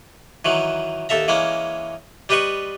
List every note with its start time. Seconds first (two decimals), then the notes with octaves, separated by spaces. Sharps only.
0.45 D#3 E3 F#3
1.09 D#2 A4 E5 A#5
1.28 E3 G#3 A#3 C#4
2.29 G3 G4 B4 D#5 C6 C#6